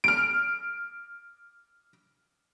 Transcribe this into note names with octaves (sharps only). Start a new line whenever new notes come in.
F6 D7